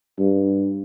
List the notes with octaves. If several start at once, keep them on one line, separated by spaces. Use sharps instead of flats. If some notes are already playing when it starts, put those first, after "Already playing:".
G2